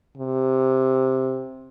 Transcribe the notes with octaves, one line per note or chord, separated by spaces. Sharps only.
C3